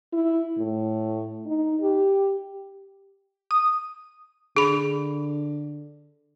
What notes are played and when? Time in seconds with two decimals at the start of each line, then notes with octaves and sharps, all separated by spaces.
0.12 E4
0.58 A2
1.46 D#4
1.81 G4
3.51 D#6
4.57 D3 G#4 B5